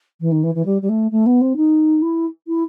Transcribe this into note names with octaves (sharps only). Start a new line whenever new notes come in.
E3
D#3
E3
E3
G3
G3
A3
A3
B3
C4
D#4
E4
E4